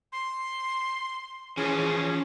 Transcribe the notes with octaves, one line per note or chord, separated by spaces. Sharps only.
C6
E3 F3 C#4 G#4